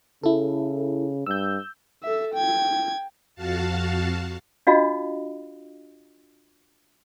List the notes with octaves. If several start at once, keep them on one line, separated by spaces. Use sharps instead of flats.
C#3 E4 A4
G2 E6 G6
A4 E5
G5 G#6
F2 F#4 F5 A5
D4 F4 F#4 D#5 F5